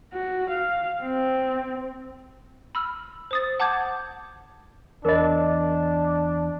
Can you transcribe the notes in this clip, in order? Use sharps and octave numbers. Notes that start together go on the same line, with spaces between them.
F#4
F5
C4
B5 E6 F6
C5 D#6 A6
F#5 A5 D6 G6 G#6
E2 D4 A#4 C#5 D#5 B5